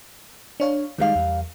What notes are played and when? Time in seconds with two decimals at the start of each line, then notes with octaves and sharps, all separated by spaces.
0.60 D4 C#5 F5
0.98 D#3 G3 G#3 D#4 A#4 F5
1.15 E2